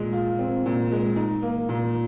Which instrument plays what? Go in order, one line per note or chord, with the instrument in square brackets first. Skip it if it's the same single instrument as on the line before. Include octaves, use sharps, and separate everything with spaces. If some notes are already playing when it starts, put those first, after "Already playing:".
Already playing: [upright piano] A#2 G#3
F4
C4
A#2
G#3
D#4
A#3
A#2